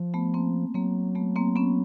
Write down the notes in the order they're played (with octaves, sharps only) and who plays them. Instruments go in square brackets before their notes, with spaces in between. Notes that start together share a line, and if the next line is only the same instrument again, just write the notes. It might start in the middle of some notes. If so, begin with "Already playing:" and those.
Already playing: [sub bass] F3
[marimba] A3 B3
A#3 C4
[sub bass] F#3 [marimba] A#3 C4
[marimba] A3 B3
A#3 C4
B3 C#4